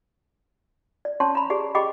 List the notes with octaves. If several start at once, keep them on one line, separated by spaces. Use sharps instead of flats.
D5
C#4 C#5 A5 C6 C#6
A#5 B5
G4 G#4 D5
G4 G#4 D#5 G5 B5 D6